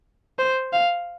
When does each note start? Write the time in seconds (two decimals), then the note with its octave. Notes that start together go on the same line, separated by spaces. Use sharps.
0.39 C5
0.73 F5